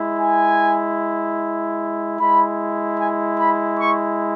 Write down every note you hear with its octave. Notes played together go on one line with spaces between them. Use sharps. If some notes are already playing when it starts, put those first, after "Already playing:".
Already playing: G#3 E4
G#5
G#3 E4 B5
G#5
B5
C#6